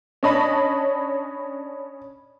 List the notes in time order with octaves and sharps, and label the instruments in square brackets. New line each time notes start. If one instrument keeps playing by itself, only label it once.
[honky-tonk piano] C#4 D4 C#5 D#5 A5 B5